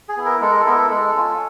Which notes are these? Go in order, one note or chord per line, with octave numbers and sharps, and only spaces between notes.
G#4
B3 E4
A#4
G#3 A4
A#4
A4
B3 E4 A#4
A4
G#3 A4
C#4 F4